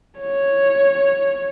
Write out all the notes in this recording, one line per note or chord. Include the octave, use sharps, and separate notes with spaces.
C#5